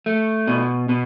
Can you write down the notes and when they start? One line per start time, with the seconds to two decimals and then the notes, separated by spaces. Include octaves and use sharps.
0.06 A3
0.47 B2
0.89 B2